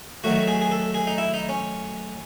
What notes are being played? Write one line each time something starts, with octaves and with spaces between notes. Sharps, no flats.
D#3 F#3 A3 F#4
G#4
G#4
A4
G#4
D#4
E4
D#4
C#4